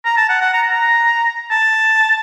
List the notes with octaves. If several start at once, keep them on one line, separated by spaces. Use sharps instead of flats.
A#5
A5
F#5
F#5
A#5
A#5
A5